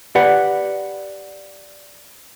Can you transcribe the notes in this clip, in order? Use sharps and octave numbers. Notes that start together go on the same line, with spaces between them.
G4 B4 D5 F#5